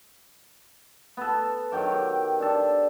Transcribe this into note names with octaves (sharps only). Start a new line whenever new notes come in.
B3 A4
D#3 F#3 G5 D6
G4
D4 A4